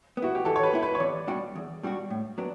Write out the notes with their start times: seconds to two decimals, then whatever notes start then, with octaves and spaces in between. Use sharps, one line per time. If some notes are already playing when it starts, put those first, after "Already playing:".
0.17 B3
0.22 E4 F#4
0.35 G4
0.45 E3 A4
0.56 C#5
0.63 B4
0.73 B3 E4
0.83 B4
0.95 C#5
1.00 E2 D5
1.28 B2 G3 D4 F#4
1.55 E2
1.83 B2 G3 D4 F#4
2.10 A2
2.38 F#3 B3 D4